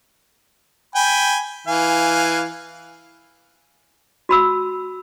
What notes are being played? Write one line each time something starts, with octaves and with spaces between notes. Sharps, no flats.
G5 G#5 B5
E3 F5 G#5
F#4 B5 E6